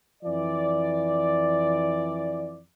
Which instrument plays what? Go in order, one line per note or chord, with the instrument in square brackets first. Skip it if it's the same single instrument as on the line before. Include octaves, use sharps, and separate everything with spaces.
[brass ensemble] F2 E3 D5